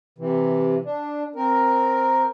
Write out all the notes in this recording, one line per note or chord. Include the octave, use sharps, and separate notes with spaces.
C3 E3
D4
C4 A#4